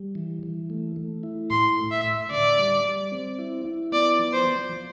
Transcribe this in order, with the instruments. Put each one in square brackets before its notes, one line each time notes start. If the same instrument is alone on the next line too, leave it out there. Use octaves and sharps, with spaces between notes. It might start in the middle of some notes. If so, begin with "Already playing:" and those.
Already playing: [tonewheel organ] G3
E3
E3
A3
A3
E4
[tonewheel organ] A2 [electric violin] C6
[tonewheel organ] A3
[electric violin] E5
[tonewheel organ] A2
[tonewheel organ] D3 [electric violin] D5
[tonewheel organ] G3
G3
C4
E4
E4
[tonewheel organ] B3 [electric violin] D5
[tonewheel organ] F3
[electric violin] C5
[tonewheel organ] F3
F3